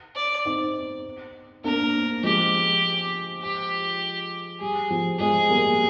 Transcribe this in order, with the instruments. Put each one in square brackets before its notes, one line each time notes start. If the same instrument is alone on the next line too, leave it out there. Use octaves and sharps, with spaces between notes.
[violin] D5
[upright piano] C4 D#4
[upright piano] A#3 D4 [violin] A#4
[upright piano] F3 G#3 [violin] G4
[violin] G4
[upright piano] G3 [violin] G#4
[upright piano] F3
[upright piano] F3 G#3 [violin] G#4
[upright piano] G3 A#3